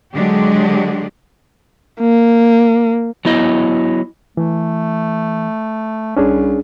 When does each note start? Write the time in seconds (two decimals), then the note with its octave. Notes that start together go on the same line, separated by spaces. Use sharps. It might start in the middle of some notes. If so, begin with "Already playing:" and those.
0.14 D3 F#3 G#3 D4 G4
2.00 A#3
3.25 F#3 B3 E4 D#5
4.37 E3 A3
6.17 C2 C#4 D4 G#4